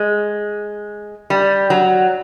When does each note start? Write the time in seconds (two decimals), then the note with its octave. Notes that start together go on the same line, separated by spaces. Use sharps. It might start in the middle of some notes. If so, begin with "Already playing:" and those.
Already playing: G#3
1.30 G3
1.70 F#3